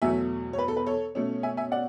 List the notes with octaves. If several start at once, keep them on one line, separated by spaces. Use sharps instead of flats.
E2 B2 F#3 A3 E5 G#5
C#5
B4
A4
B4
A4 C#5
B2 A3 C#4
E5 G#5
E5 G#5
D5 F#5